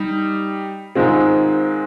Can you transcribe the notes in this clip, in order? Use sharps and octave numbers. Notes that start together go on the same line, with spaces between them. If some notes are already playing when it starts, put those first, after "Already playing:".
Already playing: G3 D#4
G#2 D#3 G#3 C4 F4